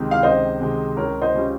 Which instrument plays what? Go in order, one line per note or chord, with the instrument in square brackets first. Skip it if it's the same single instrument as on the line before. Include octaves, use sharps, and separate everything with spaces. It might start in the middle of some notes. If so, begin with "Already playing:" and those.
Already playing: [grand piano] C#2 C3 D#3 G#3 C4
[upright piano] F5
[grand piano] C#2 [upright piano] C5 D#5
[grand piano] C3 D#3 G#3 C4
[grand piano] C#2 [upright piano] A#4 C#5
[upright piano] C5 D#5
[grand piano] C#3 G3 C#4 F4